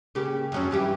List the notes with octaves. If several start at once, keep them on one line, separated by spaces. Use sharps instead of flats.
C#3 A#3 G4
F2 F#3 C#4
G2 E3 G4